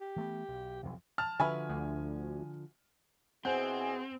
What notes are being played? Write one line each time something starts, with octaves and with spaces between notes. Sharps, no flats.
G4
E3 A3 B3
B1
B1 F2 C3
A5 F6
D3 F3 F#4 B4 E5 G#5
D2
B2 C4 E4 G#4 C5 F#5 G#5 G6